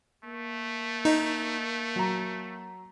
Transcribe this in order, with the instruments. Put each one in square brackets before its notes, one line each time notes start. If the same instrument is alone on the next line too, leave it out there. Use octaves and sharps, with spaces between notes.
[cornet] A3 [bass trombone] A#3
[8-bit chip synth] D#4 [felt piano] D#5
[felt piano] F#3 A#5